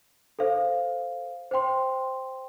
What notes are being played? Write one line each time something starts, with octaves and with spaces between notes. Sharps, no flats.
A4 C5 F5
C5 G5 C6